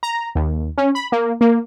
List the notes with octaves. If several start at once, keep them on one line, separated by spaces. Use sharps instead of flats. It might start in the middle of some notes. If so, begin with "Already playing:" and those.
A#5
D#2
C#4
B5
A#3
A#3